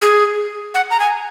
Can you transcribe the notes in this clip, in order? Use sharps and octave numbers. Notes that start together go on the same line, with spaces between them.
G#4
F#5
A#5
G#5